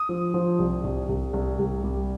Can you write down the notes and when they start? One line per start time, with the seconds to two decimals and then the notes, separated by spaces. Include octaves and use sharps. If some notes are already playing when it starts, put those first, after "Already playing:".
Already playing: D#6
0.09 F3
0.34 F3
0.59 C2
0.84 C2
1.09 C2
1.33 C2
1.59 C2
1.84 G3